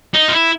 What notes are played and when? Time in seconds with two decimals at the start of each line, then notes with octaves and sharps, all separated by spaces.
0.14 D#4
0.29 F4
0.33 E4